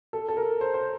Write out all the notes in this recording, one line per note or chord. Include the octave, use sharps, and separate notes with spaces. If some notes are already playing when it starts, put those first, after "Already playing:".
A4
A4
A#4
C5
C5